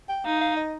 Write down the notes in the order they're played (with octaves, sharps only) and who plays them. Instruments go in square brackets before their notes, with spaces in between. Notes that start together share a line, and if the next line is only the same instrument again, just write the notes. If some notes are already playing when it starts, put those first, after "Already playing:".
[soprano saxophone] G5
[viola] D#4 [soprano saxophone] F5
[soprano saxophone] F5
D#5